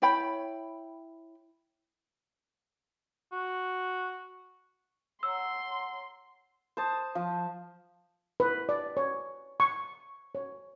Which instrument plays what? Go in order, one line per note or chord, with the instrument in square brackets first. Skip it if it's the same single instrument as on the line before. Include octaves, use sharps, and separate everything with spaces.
[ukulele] E4 C#5 G5 B5
[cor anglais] F#4
[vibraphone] C#5 F#5 A#5 [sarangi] C6 [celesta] E6
[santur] C5 A5 D#6
F3
[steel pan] B4
D5
C#5
C#6
C#5